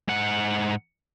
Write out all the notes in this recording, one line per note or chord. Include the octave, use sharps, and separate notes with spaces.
G#2 F#5